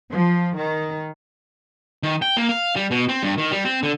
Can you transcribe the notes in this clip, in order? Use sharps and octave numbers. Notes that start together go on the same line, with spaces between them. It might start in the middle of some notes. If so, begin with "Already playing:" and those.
F3
D#3
D#3
G5
A#3
F5
G3
B2
C4
G2
D#3
G3
C4
D3